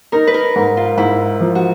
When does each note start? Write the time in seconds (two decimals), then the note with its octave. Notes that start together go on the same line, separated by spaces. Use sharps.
0.12 D#4 A#4
0.27 B4
0.34 A#4
0.56 G#2
0.77 F4
0.97 G#2 E4
1.40 F3
1.55 F#4